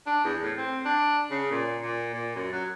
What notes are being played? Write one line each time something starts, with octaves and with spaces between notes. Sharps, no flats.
D4
E2
A2
C4
D4
C#3
A#2
A#2
A#2
F#2
F#3